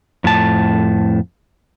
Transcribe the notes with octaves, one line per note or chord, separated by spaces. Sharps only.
F2 A2 A5